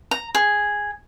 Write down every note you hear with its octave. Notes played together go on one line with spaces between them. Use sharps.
A#5
G#4